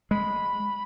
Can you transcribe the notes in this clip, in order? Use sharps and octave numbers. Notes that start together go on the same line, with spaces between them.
G#3 B5